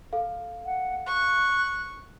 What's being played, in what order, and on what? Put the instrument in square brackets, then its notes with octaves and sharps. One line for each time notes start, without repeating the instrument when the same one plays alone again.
[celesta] A4 F5
[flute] F#5
[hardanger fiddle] C#6 [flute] F#6